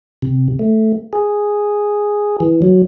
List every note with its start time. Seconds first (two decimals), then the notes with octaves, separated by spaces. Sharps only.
0.22 C3
0.59 A3
1.13 G#4
2.40 E3
2.62 F#3